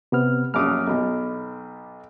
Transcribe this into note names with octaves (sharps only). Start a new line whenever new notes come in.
C3 B3 F6
A#1 F#2 D6 D#6 F6
B1 B2